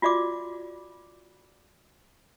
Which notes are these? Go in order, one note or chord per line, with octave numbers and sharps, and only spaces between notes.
F4 F#4 D5 E5 D6